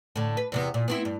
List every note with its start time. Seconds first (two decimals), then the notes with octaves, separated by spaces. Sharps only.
0.16 A2 D3
0.37 B4
0.52 E2 C3 B3
0.74 A#2
0.88 B3 C4 E4
1.05 G2